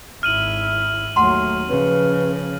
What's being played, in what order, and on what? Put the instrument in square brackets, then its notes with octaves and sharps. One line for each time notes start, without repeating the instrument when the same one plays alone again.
[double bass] G#1 E4 [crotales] F6 D#7 F#7
[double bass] D#2 F#3 [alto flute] A3 [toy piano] F#5 A#5 C6
[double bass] C#3 F3 [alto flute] B4